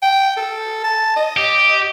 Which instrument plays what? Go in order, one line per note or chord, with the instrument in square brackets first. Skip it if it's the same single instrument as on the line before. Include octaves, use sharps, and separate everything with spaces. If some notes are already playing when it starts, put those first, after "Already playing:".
[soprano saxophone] G5
A4
A5
D#5
[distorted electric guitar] G4